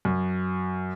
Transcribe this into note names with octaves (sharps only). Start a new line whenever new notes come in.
F#2